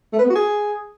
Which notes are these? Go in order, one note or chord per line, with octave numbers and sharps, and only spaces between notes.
A3
B4
B3
F#4
G#4